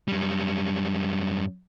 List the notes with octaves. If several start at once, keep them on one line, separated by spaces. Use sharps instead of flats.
F#2 G3